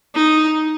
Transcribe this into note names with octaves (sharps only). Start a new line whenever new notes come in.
D#4